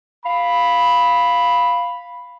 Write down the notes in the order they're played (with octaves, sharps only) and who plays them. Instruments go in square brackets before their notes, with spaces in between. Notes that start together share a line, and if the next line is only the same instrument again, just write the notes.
[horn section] F5 B5